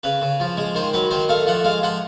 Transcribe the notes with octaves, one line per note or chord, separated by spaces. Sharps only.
C#3 B4
C#3
F3
G#3
D#3 C5
F#3 B4
D#3 C5
A3 F5
F3 F#5
G#3 F5
F3 F#5